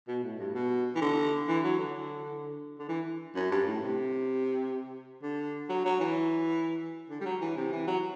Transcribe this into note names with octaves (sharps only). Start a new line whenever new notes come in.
B2
A2
G2
B2
E3
D3
E3
F#3
D3
D3
E3
F#2
G2
A2
C3
D3
F#3
F#3
E3
D3
G3
F#3
E3
C3
E3
F#3